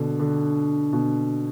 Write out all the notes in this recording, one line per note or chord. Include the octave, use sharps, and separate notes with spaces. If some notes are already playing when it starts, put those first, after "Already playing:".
Already playing: B2 D3
D3
B2